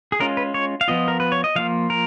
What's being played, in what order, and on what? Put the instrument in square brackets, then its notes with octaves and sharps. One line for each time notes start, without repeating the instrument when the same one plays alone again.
[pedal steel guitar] G#4
G#3 C#4 F4 A#4
B4
C#5
F5
F3 B3 F4 D#5
A#4
B4
C#5
D#5
F3 A#3 F4 F5
A#4